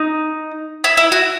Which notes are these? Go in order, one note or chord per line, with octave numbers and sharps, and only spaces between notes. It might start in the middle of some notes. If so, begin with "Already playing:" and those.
Already playing: D#4
E4
E4
F#4